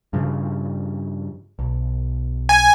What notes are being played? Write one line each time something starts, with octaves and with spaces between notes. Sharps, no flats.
G2 C#3 F3
B1
G#5